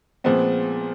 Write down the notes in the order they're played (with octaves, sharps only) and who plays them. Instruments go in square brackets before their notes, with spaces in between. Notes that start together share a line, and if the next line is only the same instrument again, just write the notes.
[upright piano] A#2 F3 G#3 B3 C4